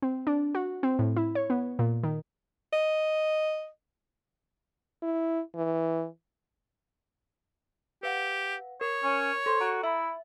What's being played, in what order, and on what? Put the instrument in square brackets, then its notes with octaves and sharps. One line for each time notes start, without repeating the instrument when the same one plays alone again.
[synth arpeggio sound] C4
D4
F#4
C4
A2
E4
C#5
B3
A#2
D#3
[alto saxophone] D#5
[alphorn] E4
E3
[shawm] G4 [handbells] B4 F5 F#5
[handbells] A#4 [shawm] C#5
[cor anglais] C#4
[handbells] A4 [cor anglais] C5
[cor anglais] F#4 [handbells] A#5 D7
[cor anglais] E4 [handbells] E5